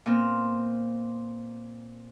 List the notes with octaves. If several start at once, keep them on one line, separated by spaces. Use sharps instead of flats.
A#2 B3 C4 F6